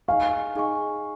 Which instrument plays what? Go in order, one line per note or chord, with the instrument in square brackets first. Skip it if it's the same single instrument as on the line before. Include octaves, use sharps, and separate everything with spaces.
[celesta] D#4 G#4 D#5 G#5 C#6 [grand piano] F5
[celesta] D#4 G#4 D#5 G#5 C#6